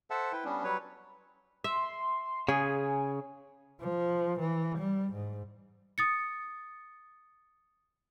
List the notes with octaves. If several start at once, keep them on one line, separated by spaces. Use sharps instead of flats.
A4 C5 E5 F#5 A5
E4 B4 G5
G3 B3 C#4 D4
F#3 G3 B4 C#5
E5 C6
C#3 G#4 G#5
F3
E3
G3
G#2
D#6 A6 C#7